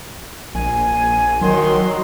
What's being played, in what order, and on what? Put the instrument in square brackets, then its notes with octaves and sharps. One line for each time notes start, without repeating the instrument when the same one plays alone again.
[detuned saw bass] A#1 [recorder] G#5
[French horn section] D#3 [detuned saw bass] F#3 [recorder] C6